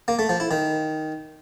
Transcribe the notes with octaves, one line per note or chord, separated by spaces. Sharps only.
A#3
A3
F3
E4
D#3